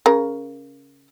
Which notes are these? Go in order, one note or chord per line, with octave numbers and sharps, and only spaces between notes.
C#3 A#4